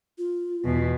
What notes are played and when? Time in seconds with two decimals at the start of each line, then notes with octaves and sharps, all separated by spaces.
0.18 F4
0.64 E2 B2